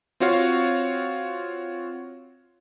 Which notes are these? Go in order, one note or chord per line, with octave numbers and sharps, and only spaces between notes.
C4 F4 F#4 C#5 F5